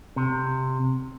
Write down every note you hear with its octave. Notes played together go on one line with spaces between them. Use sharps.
C3